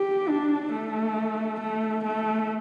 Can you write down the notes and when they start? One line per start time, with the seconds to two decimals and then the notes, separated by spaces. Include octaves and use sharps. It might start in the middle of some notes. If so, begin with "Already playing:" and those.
Already playing: G4
0.29 D4
0.72 A3
1.60 A3
2.04 A3